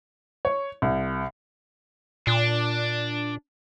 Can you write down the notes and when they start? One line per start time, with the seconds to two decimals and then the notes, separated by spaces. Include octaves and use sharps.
0.45 C#5
0.82 C2
2.27 A#2 D4